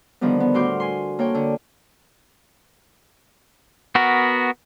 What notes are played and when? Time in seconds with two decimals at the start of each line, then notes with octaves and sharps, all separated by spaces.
0.21 D3 D#3 F3 G3 B3
0.40 B3
0.54 A2 F#4 C6 D6 F6 G6
0.80 G#5 C6
1.19 A#3 A4 C#5 G5 C#6
1.35 D3
3.95 B3 F#4 A#4